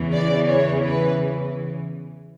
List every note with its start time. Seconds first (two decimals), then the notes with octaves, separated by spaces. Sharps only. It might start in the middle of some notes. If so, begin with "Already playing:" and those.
Already playing: E2 C#3 E3
0.14 D5
0.50 C#5
0.85 B4